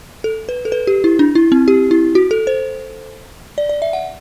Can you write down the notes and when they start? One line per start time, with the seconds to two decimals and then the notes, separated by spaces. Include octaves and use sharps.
0.24 A4
0.49 B4
0.65 A4
0.72 B4
0.87 G4
1.04 E4
1.19 D4
1.35 E4
1.52 C4
1.68 G4
1.91 E4
2.15 F#4
2.31 A4
2.47 C5
3.58 D5
3.69 D5
3.82 E5
3.93 F#5